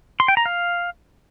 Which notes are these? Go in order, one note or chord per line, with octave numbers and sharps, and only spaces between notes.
C6
G5
A#5
F5